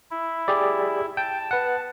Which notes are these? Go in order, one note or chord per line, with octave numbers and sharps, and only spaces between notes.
E4
G4 G#4 D5
G5 A5
B4 F#5